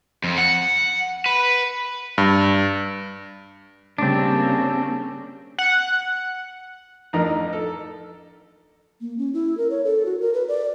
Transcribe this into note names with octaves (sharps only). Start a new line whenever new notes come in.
F2
F#5
B4
G2
C#3 G3 A#3 C4 D4
F#5
A1 F2 D4 D#4 A#4 A#5
A4
A#3
C#4
E4
A#4
C#5
A4
F#4
A#4
B4
D5